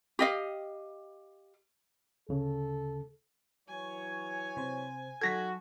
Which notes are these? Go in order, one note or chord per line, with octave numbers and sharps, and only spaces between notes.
G4 D#5 F5
D2 C#3 A4
E3 F#3 C#5 G#5
C3 C5
F#3 D#4 F#4 A4 G#6 A#6 B6